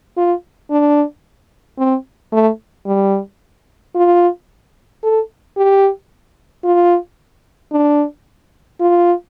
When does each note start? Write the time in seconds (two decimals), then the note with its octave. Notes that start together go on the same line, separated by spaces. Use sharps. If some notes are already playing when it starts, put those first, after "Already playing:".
0.17 F4
0.71 D4
1.79 C4
2.32 A3
2.86 G3
3.95 F4
5.03 A4
5.57 G4
6.64 F4
7.72 D4
8.81 F4